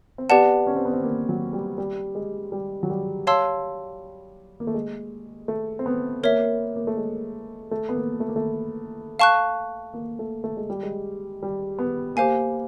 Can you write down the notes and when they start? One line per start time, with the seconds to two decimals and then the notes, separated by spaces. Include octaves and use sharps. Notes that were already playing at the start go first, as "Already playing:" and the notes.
0.18 C4
0.29 B3 G4 B4 D5 F#5 A5
0.67 C#4
0.76 C4
0.85 B3
0.93 C4
1.03 A#3
1.29 F#3
1.53 G3
1.78 G3
2.15 G#3
2.52 G3
2.83 F#3
2.90 G3
3.27 C#5 F5 A5 C6 E6
4.60 A#3
4.67 A3
4.74 G#3
5.48 A3
5.79 C4
5.86 B3
6.23 A#3 A#4 C#5 E5
6.76 A#3
6.87 A3
6.97 G#3
7.71 A3
7.89 B3
7.95 A#3
8.20 A3
8.29 A#3
8.36 A3
9.19 F5 A5 C#6 F#6
9.94 A#3
10.19 A3
10.44 A3
10.57 G#3
10.70 G3
10.83 G#3
11.43 G3
11.79 B3
12.16 A#3 G4 C5 F5 G#5